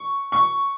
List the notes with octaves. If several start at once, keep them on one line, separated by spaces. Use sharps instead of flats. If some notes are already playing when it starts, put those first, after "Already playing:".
Already playing: C#6
C#6